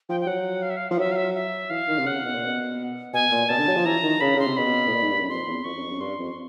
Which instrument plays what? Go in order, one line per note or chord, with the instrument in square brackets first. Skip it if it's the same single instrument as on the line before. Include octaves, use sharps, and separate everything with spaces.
[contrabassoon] F3 [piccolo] G5
[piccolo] G5
[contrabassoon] F#3 [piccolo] F#5
[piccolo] F5
E5
F5
[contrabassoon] F3 [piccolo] F5
[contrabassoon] F#3 [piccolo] E5
[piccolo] F5
E5
E5
[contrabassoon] E3 [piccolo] F5
[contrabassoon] D#3
C3
[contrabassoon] C#3 [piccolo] F#5
[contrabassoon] B2
A#2
B2
[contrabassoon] B2 [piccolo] G#5
[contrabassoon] A#2
[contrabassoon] B2 [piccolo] A5
[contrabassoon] D3
F#3
F3
[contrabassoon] E3 [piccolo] A#5
[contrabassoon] D#3
[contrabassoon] C#3 [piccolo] B5
[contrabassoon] C#3 [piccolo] C6
[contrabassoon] C3
[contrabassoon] B2 [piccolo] B5
[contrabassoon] A2
A#2
G#2
G2
F#2
[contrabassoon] F2 [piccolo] C6
[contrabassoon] E2
[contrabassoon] F2 [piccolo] C#6
[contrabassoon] F#2
F2
F#2
[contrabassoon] G2 [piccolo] C6
[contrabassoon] F2